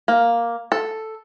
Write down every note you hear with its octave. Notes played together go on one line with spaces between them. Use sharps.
A#3
A4